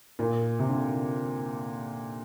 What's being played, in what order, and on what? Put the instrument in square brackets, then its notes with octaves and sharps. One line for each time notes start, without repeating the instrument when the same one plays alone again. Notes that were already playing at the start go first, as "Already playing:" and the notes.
[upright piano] A#2
C3
D3